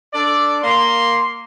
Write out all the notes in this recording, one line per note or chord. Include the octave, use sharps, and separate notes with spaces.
D4 A4 D5
A#3 C6